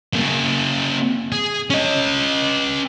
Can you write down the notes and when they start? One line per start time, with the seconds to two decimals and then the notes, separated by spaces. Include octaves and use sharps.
0.13 C#3 A#3
1.32 G#4
1.70 C#4 D#5